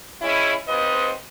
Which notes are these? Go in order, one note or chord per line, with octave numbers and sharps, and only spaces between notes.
G#3 C#4 E4
D#2 C4 B4 C5 D#5